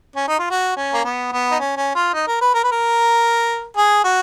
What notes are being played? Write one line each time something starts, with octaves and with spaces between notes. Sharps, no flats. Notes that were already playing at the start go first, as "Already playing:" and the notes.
C#4
D#4
F4
F#4
C#4
A#3
B3
B3
D#4
C#4
C#4
F4
D#4
A#4
B4
A#4
B4
A#4
G#4
F#4